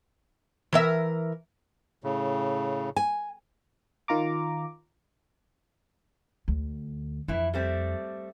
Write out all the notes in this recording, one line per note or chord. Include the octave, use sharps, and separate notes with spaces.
E3 A#4 E5
A2 C#3
G#5
D#3 F4 A#5 D6
D2
F2 E3 E4
G3 A3 C4